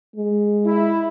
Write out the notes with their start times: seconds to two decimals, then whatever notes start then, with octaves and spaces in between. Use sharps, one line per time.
0.16 G#3
0.66 E4